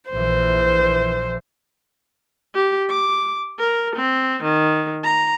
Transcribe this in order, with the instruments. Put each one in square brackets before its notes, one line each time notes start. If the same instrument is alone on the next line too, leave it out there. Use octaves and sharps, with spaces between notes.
[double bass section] A#1 E3 [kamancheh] C5
[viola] G4
D6
A#4
C4
D#3
A#5